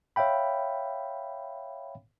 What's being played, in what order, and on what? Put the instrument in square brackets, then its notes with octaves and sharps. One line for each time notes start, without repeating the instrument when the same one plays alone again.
[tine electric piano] C#5 E5 F5 G5 B5